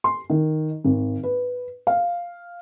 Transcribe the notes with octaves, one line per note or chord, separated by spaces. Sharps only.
C6
D#3
G#1
B4
F5